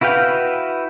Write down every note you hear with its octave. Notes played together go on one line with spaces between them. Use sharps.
E4 F#4 B4 F5 G5